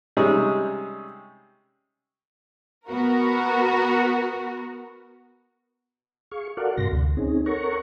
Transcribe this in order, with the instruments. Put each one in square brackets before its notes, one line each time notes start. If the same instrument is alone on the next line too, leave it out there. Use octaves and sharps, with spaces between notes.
[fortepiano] C3 G3 G#3 C#4 D#4 G#4
[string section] B3 F#4 A#4
[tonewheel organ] G#4 F5 C#6
F#4 A4 A#4 D5 F5 F#5
G2 C3 C6 A#6
D2
C4 C#4 D#4 G#4
A4 A#4 C#5 F#5 A#5 C#6